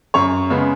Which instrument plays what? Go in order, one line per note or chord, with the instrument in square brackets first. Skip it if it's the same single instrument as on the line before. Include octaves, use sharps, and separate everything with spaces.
[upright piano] F#2 C#5
C#3 G#3 B3